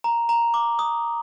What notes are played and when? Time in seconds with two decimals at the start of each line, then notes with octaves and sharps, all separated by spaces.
0.04 A#5
0.29 A#5
0.54 D6
0.79 D#6